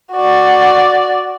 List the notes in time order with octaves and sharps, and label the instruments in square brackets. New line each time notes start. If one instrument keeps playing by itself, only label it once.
[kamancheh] F#4 D5